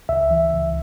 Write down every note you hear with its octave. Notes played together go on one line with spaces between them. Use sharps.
C#2 E5
E3
C#2